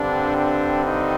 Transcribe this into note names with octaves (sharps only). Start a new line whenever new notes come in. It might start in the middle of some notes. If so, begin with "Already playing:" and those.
Already playing: G2 D3 G3 C4 D4
D4
D#4